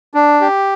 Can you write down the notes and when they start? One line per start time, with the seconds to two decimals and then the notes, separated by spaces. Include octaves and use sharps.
0.14 D4
0.41 G4